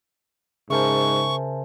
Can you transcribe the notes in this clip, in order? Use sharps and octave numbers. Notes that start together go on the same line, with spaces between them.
G#2 C#3 A#4 C5 E5 G#5 A5 C#6